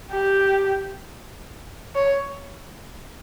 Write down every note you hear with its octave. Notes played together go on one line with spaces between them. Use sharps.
G4
C#5